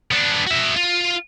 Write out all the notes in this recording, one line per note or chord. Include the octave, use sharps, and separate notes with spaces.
B3 D4
F#4 E5
F4